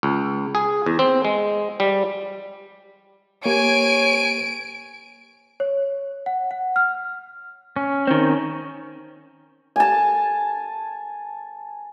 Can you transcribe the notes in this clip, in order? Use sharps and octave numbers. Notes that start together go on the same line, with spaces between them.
C#2
G#4
E2
C4
G#3
G3
A#3 G4 C#5 G#5 D7
C#5
F#5
F#5
F6
C#4
D#3 C4
G#5 A5